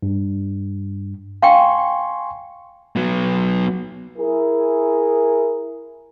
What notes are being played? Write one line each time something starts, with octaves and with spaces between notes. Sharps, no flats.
G2
F5 G5 G#5 C6 C#6
F#3 B3
E4 G#4 A#4